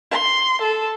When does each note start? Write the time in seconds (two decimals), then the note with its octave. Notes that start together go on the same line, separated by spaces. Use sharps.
0.11 C6
0.61 A4